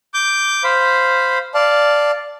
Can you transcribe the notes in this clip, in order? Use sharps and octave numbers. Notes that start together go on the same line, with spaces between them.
D6 G6
C5 F5 B5
D5 F5 A5